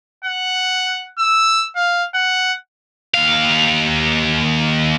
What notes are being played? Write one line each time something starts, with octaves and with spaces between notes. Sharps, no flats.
F#5
E6
F5
F#5
D#2 F5